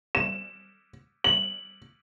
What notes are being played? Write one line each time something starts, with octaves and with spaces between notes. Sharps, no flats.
E7
F#7